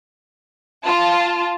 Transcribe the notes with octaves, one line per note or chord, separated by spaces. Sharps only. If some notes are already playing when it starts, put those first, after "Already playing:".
F4 A5